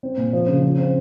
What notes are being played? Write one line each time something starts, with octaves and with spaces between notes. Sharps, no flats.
C4
A#2
F3
C#3
F3
C4